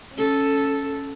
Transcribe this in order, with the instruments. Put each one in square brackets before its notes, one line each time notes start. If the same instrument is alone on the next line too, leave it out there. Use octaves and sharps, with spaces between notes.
[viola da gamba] C#4 A4